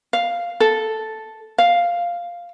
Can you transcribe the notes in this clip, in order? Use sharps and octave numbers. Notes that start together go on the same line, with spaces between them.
F5
A4
F5